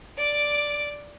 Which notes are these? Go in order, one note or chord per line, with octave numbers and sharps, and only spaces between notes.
D5 D6